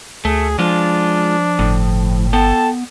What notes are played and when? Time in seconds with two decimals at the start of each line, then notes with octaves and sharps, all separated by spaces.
0.25 D2 A3 G#4
0.59 F3 G#3 D4 F4
1.59 G1 A2
2.33 B3 A4 G5 A5